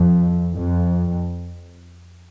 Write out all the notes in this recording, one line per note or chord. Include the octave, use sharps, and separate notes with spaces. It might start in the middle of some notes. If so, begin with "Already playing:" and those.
Already playing: F2
F2